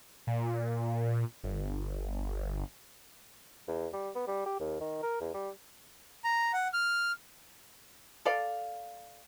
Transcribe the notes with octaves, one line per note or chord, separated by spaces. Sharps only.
A#2
G1
E2
G3
B3
G3
G4
D#2
D#3
A#4
E2
G3
A#5
F#5
F6
A4 D5 F5